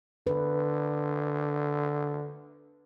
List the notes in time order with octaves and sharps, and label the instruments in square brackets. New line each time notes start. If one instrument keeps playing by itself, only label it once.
[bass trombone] D3 [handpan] B4